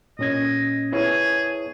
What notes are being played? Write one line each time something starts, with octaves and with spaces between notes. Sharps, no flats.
A#2 C#4 D#5 G#6
B3 E4 G#4 C#5